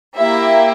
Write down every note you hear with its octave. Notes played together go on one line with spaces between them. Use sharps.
A#3 E4 G4 E5